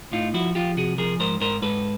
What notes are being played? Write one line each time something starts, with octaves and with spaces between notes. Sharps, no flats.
A2 D#4 F4
F3 E4 F#4
F3 F4 G4
C3 F#4 G#4
F3 G#4 A#4
G#2 A#4 C5
G#2 A#4 C5
G#2 A4 B4